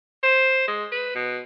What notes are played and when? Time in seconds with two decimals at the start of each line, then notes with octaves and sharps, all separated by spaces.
0.23 C5
0.68 G#3
0.92 B4
1.15 B2